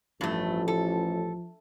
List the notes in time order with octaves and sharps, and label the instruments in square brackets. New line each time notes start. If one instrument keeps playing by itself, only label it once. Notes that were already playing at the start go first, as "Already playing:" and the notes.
[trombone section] A1 [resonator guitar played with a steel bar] G2 A3 [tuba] F3
[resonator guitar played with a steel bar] A4